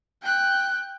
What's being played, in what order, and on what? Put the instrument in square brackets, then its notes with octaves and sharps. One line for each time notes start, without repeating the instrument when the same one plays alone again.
[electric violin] G5 F#6